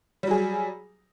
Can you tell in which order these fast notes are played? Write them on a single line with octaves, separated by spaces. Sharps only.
G3 F#3 G#4